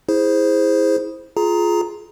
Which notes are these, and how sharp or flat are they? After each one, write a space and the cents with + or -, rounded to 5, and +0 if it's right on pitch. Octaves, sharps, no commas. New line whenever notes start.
E4 -15 G#4 -5 C5 +0
F4 +0 G#4 +20 A#5 +0